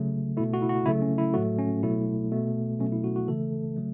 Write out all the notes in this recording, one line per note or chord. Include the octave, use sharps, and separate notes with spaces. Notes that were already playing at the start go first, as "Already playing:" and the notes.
Already playing: C#3 F#3 A3
B2 A3 E4
F#4
E4
F#4
C#3 F#3 A3 E4
C#4
E4
A2 F#3 A3 F#4
C#4
B2 F#3 A3 E4
B2 A3
B2 F#3 A3 C#4
E4
F#4
F#4
C#3 E3 A3 A4
C#3 F#3 A3